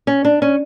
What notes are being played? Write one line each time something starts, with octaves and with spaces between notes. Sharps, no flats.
C#4
D4
C#4